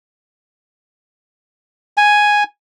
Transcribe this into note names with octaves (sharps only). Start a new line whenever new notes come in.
G#5